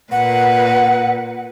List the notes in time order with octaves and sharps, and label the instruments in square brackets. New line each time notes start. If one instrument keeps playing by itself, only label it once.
[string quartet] A#2 B4 [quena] F#5